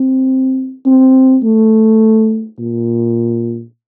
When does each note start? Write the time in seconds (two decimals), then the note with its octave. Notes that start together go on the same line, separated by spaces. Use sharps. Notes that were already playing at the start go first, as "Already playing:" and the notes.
Already playing: C4
0.86 C4
1.43 A3
2.59 A#2